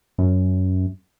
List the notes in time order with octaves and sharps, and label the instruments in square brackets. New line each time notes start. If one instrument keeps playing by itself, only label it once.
[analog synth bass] F#2